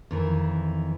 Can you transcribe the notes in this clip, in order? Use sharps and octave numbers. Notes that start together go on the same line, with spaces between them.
F2 D#3 E3